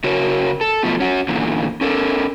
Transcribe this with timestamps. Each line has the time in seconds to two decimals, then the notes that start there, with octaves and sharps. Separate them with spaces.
0.04 C#3 F#4 A#4 C#5
0.61 A4
0.83 B2 F3 A3
1.00 C#4 F#4
1.28 E2 A#2 D3 E3
1.81 C#4 A4 A#4